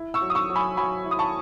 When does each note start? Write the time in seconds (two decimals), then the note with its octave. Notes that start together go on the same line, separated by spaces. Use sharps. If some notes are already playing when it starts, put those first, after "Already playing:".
Already playing: E4
0.14 C#6 E6
0.22 F#3
0.30 D#6
0.35 C#6 E6
0.50 F#3
0.56 G#5 B5
0.77 F#3 G#5 B5
1.05 E4
1.11 D#6
1.19 A5 C#6